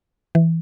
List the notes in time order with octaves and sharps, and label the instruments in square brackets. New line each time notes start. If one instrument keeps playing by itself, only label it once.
[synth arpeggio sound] E3